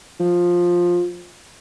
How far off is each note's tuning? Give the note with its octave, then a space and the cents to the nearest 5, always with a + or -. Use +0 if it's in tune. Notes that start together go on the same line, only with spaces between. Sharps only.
F3 +10